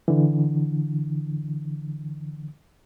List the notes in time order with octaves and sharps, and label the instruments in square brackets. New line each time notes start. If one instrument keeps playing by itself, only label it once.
[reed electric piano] D3 E3